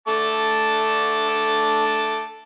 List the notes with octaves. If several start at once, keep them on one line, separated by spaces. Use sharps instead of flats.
A3 A5 D6